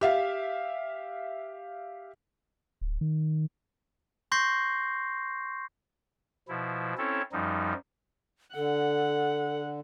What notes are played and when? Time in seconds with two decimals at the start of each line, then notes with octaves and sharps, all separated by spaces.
0.01 G4 E5 F5
2.81 D1
3.01 D#3
4.32 C6 C#6 G6 A#6 C7
6.48 B2 F3 E4
6.98 C4 C#4 E4 A4 C#5
7.32 F#2 F3 G3 D#4
8.55 D3 A4 F#5